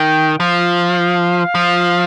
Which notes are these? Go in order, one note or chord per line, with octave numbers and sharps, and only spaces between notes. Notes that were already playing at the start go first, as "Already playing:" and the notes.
Already playing: D#3 G5
F3 F5
F3